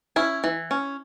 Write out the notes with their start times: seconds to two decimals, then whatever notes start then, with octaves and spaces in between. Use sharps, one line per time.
0.16 C#4 E4
0.44 E3
0.71 C#4